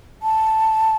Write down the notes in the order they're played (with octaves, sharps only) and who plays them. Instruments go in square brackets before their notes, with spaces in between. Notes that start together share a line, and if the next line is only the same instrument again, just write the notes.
[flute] A5